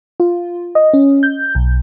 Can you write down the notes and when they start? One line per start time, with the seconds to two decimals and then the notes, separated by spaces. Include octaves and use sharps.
0.20 F4
0.75 D#5
0.93 C#4
1.23 G6
1.55 B1